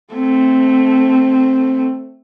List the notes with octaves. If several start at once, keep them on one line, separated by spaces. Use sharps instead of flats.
A3 C4